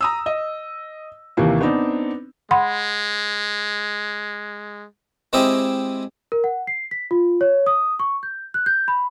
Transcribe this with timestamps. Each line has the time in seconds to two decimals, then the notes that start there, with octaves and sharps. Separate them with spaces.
0.01 A#5 D#6 E6
0.26 D#5
1.37 D#2 C3 E3 A#3
1.61 B3 C4 D4 D#4
2.51 G#3 F#5 B5 C6
5.33 G#3 C4 E4 G4 D#5 E5
6.32 A#4
6.44 F#5
6.67 C7
6.91 B6
7.11 F4
7.41 C#5
7.66 D#6
7.99 C#6
8.23 G6
8.54 F#6
8.66 G6
8.88 B5